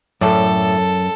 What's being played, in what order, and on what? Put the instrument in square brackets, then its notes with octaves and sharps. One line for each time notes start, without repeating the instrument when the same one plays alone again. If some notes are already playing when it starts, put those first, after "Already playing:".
[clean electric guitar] F#2 [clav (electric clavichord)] A2 D5 [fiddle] A4